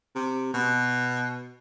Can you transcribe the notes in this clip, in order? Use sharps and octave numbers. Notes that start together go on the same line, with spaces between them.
C3
B2